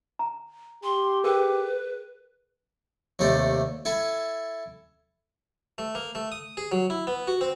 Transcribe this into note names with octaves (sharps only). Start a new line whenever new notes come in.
A#5
G4 C6
G#4 A#4 B4 G5
D#2 C3 A3 A4 C5 D5
E4 A4 G#5 A5
A3
A#3
A3
D#6
G#4
F#3
E4
B3
F#4
C4